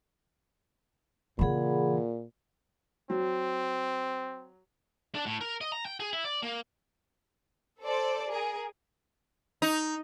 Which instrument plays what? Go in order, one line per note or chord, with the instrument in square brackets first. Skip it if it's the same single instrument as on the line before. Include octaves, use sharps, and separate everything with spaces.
[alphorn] A#2 [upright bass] C#3 E3 [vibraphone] G#4 F#5 B5
[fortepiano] F#3 [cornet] C4
[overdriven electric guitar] D4
A2
A#4
D#5
A#5
G5
G#4
E4
D5
A#3
[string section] A4 C5 D5
G#4 A#4
[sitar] D#4